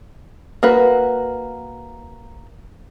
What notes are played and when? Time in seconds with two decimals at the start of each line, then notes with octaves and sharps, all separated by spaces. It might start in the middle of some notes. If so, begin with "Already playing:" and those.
0.63 A#3 F#4 B4